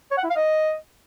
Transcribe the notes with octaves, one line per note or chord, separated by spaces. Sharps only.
C#5
F#5
E4
F5
D#5